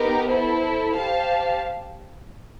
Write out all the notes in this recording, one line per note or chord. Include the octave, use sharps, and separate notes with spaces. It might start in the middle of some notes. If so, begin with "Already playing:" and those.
Already playing: B3 D#4 G4 A#4
E4 A4 C5
G4 C5 F5 A5